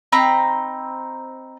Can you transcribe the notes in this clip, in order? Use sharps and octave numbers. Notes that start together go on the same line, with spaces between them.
C4 D#4 A#5 B5